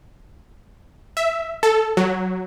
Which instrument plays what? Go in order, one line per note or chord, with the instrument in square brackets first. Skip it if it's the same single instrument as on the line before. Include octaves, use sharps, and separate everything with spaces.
[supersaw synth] E5
A4
F#3